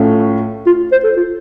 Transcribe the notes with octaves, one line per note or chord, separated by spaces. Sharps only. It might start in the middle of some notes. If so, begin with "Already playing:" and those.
Already playing: A2 A3 C#4 F4
F4
C5
A4
F4